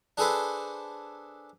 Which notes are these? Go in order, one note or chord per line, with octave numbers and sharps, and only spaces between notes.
D4 G#4 A4 B4 C5